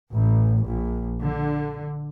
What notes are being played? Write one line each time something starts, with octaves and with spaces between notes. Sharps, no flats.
A1
A#1
D3